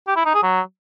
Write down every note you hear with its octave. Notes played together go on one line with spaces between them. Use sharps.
G4
E4
D#4
G#4
F#3